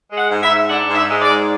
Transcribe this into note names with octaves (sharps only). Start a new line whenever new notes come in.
G#3
F#5
G#2
E5
G#2
D4 F#5
G#2
E5
G#3
D5
G#2